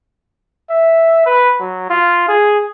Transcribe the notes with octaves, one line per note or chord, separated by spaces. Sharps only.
E5
B4
F#3
F4
G#4